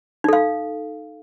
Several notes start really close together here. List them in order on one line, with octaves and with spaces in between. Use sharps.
D#4 A4 F5